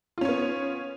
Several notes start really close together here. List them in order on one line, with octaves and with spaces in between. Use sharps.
F4 C#4 C#5 B3